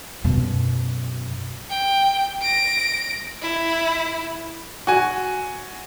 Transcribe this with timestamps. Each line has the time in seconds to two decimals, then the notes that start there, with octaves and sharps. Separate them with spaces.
0.24 F#2 B2
1.70 G5
2.41 A#6 D7
3.42 E4
4.87 F#4 G#5